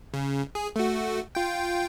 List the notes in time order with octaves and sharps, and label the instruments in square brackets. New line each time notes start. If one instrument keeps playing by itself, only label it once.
[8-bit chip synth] C#3
G#4
A3 F#4
F4 G5